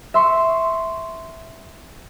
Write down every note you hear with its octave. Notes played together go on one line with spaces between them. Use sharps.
E5 C6 C#6